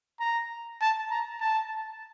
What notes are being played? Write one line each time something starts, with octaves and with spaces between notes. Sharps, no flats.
A#5
A5
A#5
A5